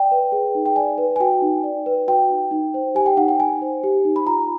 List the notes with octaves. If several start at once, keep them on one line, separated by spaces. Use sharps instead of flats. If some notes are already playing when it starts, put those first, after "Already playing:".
Already playing: D5 G5
B4
G#4
D#4
G5
D5 G#5
B4
G#5
F#4 G5
D#4
D5
B4
F#4 G5
D#4
D#4
C5
G4 G#5
G5
D#4 F#5
G5
D#4 G#5
C5
G4
D#4
B5
F4 A#5